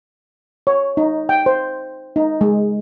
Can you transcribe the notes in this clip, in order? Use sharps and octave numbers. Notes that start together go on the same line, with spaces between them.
C#5
D#4
G5
C5
D#4
G#3